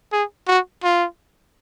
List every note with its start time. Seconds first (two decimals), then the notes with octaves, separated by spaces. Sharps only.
0.13 G#4
0.48 F#4
0.84 F4